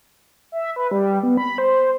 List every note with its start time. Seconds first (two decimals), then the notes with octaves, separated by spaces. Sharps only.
0.52 E5
0.76 B4
0.91 G3
1.23 B3
1.37 B5
1.58 C5